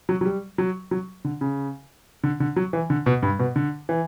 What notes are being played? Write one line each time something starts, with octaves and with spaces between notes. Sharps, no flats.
F#3
F#3
G3
F#3
F#3
D3
C#3
D3
D3
F#3
E3
D3
B2
G2
B2
D3
E3